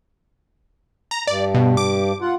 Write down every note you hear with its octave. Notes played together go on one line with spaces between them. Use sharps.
A#5
G2 D5
B2
D6
F4 F#5